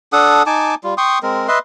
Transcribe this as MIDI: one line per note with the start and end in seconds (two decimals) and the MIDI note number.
0.13 0.43 62
0.13 0.43 69
0.13 0.43 78
0.13 0.43 87
0.46 0.75 63
0.46 0.75 80
0.46 0.75 81
0.46 0.75 86
0.84 0.94 55
0.84 0.94 65
0.98 1.19 79
0.98 1.19 84
0.98 1.19 85
0.98 1.19 87
1.23 1.47 56
1.23 1.47 60
1.23 1.47 70
1.48 1.59 71
1.48 1.59 75
1.48 1.59 76
1.48 1.59 84